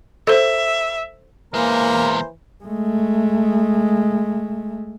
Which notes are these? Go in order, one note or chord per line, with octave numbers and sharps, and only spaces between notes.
A4 C5 E5
E2 E3 G#3 A#3 A#4 C5
G#3 A3